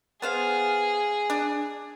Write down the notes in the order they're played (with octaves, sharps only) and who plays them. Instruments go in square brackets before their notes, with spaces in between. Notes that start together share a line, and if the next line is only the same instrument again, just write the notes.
[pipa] B3 C5 F5 [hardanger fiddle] G#4
[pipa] D4